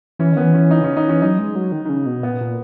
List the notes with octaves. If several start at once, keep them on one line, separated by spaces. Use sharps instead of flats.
E3 C#4
D#3 B3
E3
C#4
D#4
C#3 C#4
D#3 D#4
E3 C#4
F#3 D#4
G#3
F#3
D#3
D#3
C#3
B2
A#2 B3
A#2